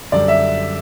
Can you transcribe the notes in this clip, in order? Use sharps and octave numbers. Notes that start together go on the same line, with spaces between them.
F#2 D3 G3 D5
E5